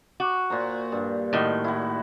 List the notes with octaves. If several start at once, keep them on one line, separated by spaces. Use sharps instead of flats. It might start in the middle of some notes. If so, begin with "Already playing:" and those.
F#4
A#2 C5 A#5
G2
A2 D#3 F#4
E4 F#4